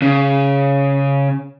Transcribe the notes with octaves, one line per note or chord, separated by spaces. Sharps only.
C#3